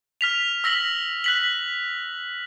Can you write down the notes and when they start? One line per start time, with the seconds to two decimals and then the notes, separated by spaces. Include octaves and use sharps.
0.21 F6 B6 F7
0.64 E6 A#6 B6 F#7
1.24 F#6 B6 F#7